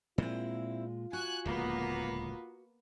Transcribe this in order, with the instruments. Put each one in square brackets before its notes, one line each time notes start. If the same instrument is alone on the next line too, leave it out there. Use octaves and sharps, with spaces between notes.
[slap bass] A#2 G#3 [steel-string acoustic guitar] C4 E4 [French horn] F4
[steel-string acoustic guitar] F#4 [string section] G#5 F#6
[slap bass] D1 C#2 F3 [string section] A#3 B3 B4